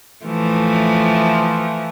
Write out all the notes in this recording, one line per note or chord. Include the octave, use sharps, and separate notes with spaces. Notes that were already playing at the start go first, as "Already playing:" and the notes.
E3 F3 A3